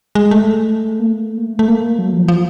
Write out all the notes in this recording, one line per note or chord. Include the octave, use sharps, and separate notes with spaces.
G#3
A3
A#3
A3
A#3
A3
A3
A#3
F#3
F3
E3
F3